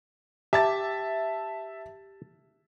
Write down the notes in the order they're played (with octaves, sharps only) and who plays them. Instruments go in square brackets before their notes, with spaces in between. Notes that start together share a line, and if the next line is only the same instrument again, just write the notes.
[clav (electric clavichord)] G4 [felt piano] E5 A5 A6